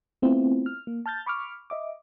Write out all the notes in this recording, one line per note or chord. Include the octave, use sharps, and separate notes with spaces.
A3 B3 C4 E4 F4
F6
A#3
A5 F6 G6 A6
B5 C#6 D6 F6
D#5 E5 D6